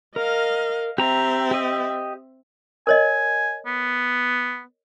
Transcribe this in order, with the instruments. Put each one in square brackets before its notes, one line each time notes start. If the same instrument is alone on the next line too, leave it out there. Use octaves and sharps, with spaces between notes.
[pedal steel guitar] A#4 [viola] D#5 F5
[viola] C4 E5 [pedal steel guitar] G4 A#5
[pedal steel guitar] G4 D#5
[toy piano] A#4 C#5 D#5 [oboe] G#5
[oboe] B3